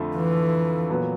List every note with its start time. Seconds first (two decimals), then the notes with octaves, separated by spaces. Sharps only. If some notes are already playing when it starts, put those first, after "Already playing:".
Already playing: F2 D3 F3 A3
0.17 E3
0.90 A#2 F#3 B3